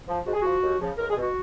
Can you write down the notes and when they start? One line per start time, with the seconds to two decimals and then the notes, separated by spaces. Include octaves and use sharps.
0.08 F3
0.26 G#2 F#4
0.34 G#4
0.41 F3 F#4
0.62 D#2
0.80 C#3 F3
0.98 C#2 A#4
1.10 G#4
1.16 B2
1.22 F#4